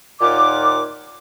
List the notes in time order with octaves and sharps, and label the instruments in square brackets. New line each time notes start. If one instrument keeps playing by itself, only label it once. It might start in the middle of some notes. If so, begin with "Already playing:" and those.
[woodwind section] D#2 A#2 D#3 F4 F#5 D6